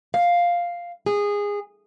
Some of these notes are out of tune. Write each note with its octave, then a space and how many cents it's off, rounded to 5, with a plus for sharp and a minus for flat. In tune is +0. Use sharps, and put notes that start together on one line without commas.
F5 +0
G#4 -20